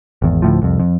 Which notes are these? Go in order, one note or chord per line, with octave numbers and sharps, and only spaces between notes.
G#1 E2
D2 A2 F3
C2 F2
F2